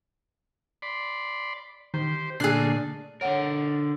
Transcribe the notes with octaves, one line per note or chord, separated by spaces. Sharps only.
D5 B5 C6
D#3 G4 C5
A#2 D3 A3 D4 G#4 F#6 C7
D3 A#4 C#5 F#5